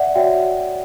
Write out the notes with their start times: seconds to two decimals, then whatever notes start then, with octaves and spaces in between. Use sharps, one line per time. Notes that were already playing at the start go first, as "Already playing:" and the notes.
Already playing: D5 E5 F#5
0.15 F#4 C#5 E5 G5